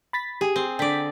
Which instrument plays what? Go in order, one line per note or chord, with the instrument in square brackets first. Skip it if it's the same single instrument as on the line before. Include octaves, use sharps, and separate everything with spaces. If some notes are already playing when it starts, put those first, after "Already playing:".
[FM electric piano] B5 A6 B6
[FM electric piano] G4 [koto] G#4
[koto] C4
[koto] D3 D5 [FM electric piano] G5 B6